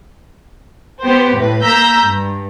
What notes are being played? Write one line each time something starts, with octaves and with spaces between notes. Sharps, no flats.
B3 G4 C5
A2 B4
A#3 A#5 E6 G6 B6
G2